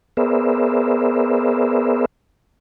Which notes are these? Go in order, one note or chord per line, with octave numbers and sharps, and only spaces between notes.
B3 G#4 A#4 C5 D5 E5